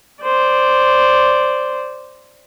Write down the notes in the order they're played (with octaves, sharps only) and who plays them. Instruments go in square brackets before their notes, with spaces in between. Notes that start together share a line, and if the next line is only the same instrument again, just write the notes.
[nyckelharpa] C5 D5